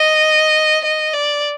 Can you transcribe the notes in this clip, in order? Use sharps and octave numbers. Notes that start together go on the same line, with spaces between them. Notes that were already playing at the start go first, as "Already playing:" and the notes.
Already playing: D#5
D#5
D5